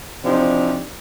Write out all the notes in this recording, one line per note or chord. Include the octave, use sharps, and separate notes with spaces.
C3 E3 F3 C4 D4 D#4